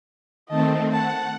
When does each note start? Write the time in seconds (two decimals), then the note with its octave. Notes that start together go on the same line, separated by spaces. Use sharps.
0.49 D#3 A3 C4 D#5 A5
0.91 F#5 A5